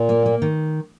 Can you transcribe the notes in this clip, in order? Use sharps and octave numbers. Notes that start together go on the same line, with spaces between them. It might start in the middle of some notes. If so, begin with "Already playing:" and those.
Already playing: A#2
A#3
A#3
D#3